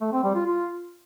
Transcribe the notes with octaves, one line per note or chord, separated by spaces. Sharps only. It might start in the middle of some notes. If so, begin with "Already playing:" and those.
A3
C4
G3
F4
F4